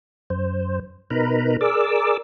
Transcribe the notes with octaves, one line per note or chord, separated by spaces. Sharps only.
F#2 C5
B2 D#4 A#4 B4 A#5 B5
G#4 A#4 D5 D6 E6